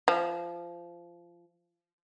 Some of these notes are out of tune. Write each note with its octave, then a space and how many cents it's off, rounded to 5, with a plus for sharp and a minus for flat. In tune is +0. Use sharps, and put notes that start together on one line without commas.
F3 -20